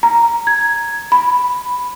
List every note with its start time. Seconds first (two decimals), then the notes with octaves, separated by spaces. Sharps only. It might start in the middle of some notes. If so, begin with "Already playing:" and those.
0.03 A#5
0.47 G#6
1.12 B5